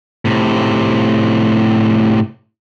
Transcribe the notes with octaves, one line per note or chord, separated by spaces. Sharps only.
A2 C3